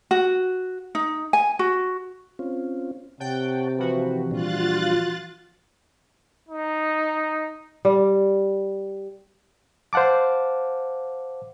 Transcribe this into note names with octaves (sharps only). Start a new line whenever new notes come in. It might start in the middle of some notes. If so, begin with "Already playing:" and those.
F#4
D#4
G#5
F#4
C4 C#4 F4
C3 C#5 F#5 G5 A5
E3 F3 F#4 G4 B4
A#2 G3 D4 F4 F#6 A6
D#4
G3
C5 F5 F#5 A5 D6